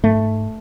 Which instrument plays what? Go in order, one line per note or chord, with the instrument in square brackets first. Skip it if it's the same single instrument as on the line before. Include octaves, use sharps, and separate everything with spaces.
[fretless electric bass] G#2 A3